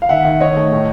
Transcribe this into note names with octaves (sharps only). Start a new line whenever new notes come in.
F5
D#3 E5 F#5
D#3
D#3 C#5 D#5
A3
A2